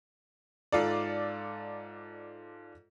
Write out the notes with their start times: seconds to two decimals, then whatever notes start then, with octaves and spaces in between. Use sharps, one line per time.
0.72 G#2 F4 A4 D5